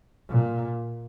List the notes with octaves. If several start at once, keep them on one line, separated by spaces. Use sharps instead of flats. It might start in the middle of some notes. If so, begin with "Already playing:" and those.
A#2